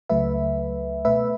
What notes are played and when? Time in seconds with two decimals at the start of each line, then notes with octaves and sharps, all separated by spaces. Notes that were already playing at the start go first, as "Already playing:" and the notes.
0.09 C#2 C#3 F#3 A3 B4 E5
1.05 B2 A3 B4 E5